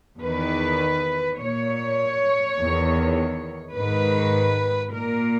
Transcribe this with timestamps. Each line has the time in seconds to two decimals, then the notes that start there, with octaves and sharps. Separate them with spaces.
0.20 E2 D#3 B4
1.37 A#2 C#5
2.56 E2 D#3
3.74 G#2 D#3 B4
4.92 A#2 A#4